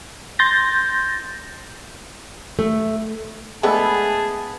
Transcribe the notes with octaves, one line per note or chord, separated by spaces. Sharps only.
C6 G6 A6 A#6
A3
G#3 A3 B3 D4 G#4 A5